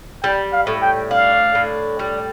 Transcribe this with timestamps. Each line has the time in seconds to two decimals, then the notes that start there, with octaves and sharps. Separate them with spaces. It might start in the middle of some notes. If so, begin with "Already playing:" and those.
0.23 G3 G5
0.53 F5
0.67 A2
0.82 G5
1.11 D4 F5
1.55 A2
1.99 G3